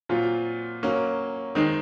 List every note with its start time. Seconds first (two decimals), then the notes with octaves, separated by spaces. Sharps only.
0.09 A#2 F#3 C4 F4
0.83 F#3 A#3 C#4
1.55 D#3 G#3 C4 D#4